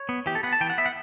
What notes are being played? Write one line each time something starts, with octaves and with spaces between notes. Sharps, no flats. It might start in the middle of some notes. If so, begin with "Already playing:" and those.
Already playing: C#5
B3
E3 G4
A4
B3 F#5
A5
E3 G5
F#5
B3 E5
F#5